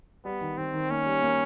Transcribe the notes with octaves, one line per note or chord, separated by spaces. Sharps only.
G3 B3
D#3
D#3 C4
D#3
A#3 C#4
G3
A#3